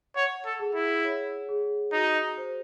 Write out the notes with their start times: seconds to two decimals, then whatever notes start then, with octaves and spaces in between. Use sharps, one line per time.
0.16 C#5 F#5
0.45 A4
0.59 G#4
0.75 E4
1.04 C#5
1.49 G#4
1.93 D#4 F#4
2.37 C5